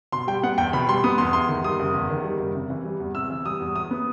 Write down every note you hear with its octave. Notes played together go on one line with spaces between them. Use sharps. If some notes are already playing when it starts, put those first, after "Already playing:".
B2 C6
G3 G5
B3 F#5
E2 G5
B2 B5
G3 C6
B3 D#6
E2 C6
E2 C6
D#3
G3 D#6
F#1
E2
D#3
G3
F#1
C3
E3
G3
E2
C3 E6
E3
G3 D#6
E2
F#3 D#6
B3